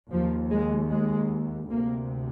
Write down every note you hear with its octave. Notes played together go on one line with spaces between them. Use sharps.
D#2 F3
G#3
G#3
D2 C3 A#3